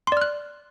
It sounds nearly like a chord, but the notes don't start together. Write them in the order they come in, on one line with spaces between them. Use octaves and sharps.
C6 D5 F6 F#6